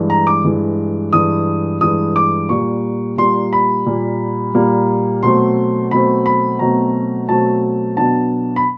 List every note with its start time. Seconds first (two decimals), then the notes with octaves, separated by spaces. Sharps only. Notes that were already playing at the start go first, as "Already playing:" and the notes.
Already playing: G2 E3 G#3
0.10 A#5
0.27 D6
0.45 G2 E3 G#3
1.13 G2 E3 G#3 D#6
1.81 G2 E3 G#3 D#6
2.16 D6
2.49 A#2 G3 A#3 C#6
3.17 A#2 G3 A#3 C6
3.53 B5
3.86 A#2 G3 A#3
4.55 A#2 G3 A#3
5.23 B2 F#3 A3 C4 C6
5.91 B2 F#3 A3 C4 B5
6.26 B5
6.59 B2 F#3 A3 C4 A#5
7.29 B2 F#3 A3 C4 A5
7.97 B2 F#3 B3 D4 A5
8.56 B5